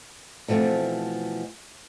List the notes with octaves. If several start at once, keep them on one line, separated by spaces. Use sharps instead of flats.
B2 E3 F3 A3 C4